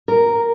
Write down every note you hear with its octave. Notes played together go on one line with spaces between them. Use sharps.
A#4